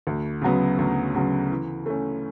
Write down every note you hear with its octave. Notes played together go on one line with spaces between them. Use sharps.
D2
C#3 F#3 B3
D2
C#3 F#3 B3
E3
A3 C#4